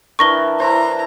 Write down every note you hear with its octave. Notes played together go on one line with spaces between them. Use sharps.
E3 D4 A#4 C#6 A#6 G7
E4 C5 A#5